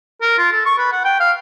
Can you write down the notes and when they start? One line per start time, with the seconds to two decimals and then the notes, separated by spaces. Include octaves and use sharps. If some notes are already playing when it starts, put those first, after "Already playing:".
0.22 A#4
0.38 F4
0.52 A4
0.66 C#6
0.78 B4
0.92 F#5
1.04 G5
1.20 F5